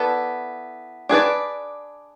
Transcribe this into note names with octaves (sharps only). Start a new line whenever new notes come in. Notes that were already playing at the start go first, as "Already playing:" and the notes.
Already playing: B3 E4 A4 D5
D4 G#4 B4 D5